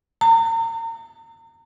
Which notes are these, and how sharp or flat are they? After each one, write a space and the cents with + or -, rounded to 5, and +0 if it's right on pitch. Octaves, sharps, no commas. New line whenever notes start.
A#5 -35